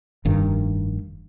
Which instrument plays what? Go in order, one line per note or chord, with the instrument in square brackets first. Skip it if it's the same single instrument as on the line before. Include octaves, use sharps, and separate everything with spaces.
[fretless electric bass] F1 G2 D#3